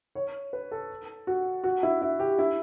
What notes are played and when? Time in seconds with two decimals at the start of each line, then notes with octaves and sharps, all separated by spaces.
0.15 C#5
0.53 B4
0.71 A4
1.27 F#4
1.64 F#4
1.83 E4
2.02 E4
2.19 G4
2.39 E4